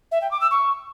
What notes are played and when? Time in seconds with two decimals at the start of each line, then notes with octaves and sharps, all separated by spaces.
0.11 E5
0.21 G5
0.31 D6
0.41 E6
0.51 C#6